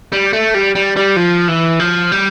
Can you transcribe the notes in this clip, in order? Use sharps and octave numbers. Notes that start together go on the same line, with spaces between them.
G3
A3
G3
G3
G3
F3
E3
F3
G3